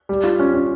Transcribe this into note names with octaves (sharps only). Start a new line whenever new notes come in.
G3
F4
C#4
C#4